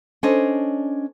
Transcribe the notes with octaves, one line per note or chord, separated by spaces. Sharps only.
C#4 D4 A4 C5 C#5 D#5